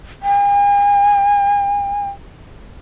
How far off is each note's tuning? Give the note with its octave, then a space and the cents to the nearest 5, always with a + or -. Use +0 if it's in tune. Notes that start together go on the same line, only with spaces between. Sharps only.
G#5 -40